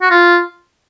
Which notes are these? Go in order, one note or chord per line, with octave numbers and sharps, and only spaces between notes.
F#4
F4